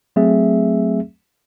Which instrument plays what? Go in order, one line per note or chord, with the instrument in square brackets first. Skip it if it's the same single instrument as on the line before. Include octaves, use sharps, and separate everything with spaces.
[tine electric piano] F#3 A3 C4 G#4 E5